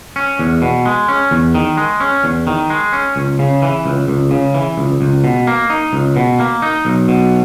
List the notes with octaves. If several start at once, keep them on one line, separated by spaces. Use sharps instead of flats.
C#4
E2
B2
G#3
C#4
E2
D#3
G#3
C#4
E2
D#3
G#3
C#4
C#2
C#3
E3
C#2
C#2
C#3
E3
C#2
C#2
B2
A#3
D#4
C#2
B2
A#3
D#4
B1
B2